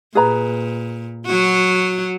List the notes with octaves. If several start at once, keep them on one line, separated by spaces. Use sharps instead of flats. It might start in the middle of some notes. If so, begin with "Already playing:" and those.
A#2 G#4 B4 A#5
F#3 F#4